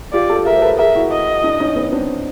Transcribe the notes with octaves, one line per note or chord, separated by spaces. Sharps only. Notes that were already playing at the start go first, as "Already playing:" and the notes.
F4 G4 D5
G4 A4
G#4 A#4 E5
C5
A4 B4
G#4 A#4 E5
E4 F#4
D#5
D4 E4
C#4 D#4
B3 C#4
C4 D4